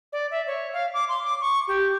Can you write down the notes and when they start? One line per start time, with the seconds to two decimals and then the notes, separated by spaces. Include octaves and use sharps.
0.13 D5
0.31 E5
0.47 C#5
0.74 F5
0.94 D6
1.09 C6
1.25 D6
1.41 C#6
1.68 G4